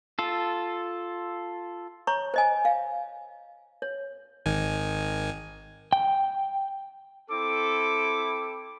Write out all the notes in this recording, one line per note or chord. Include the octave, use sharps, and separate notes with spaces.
F4 A4
C#5 A#5 C#6
C5 D#5 G#5
F5
C#5
G#1 D#3 G#5
G5
C4 E4 A4 D6